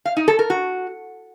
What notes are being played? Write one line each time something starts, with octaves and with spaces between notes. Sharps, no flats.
F5
D#4
A4
A#4
F#4